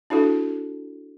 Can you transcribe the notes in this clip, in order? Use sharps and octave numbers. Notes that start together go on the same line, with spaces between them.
D4 E4 F#4 A4